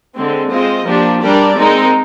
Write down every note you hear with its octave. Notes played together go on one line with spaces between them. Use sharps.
D3 G#3 C4
G#3 C4 F4 C5 D#5
F3 A#3 D4 G4
G3 D4 G4 A#4 D5
G#3 C4 D#4 A#4